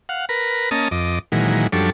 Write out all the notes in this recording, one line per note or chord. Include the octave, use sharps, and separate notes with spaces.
F5 F#5
A#4 B4
A#3 C#4 D#5 A5 D#6
F2 D#5 D6
A#2 D#3 E3 F#3 G#3
F#2 F3 G3 D4 A4 C#6